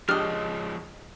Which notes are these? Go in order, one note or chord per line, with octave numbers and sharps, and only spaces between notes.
F3 G#3 D4 G4 D#5 F6